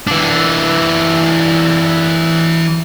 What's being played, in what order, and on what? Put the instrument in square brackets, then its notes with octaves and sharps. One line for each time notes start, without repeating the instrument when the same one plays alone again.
[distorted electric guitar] E3 D4